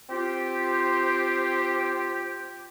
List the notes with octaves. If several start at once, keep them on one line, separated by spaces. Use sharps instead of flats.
C4 F4 G4